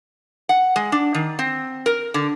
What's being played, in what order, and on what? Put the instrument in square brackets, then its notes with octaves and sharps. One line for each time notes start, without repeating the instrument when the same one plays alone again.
[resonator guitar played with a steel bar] F#5
G#3
D4
D#3
C4
A#4
D3